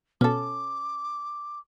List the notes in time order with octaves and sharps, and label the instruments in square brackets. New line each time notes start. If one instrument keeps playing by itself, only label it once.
[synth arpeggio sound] B2 [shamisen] C#4 A4 [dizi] D6